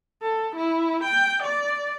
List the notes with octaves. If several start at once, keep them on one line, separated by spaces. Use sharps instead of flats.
A4
E4
G5
D5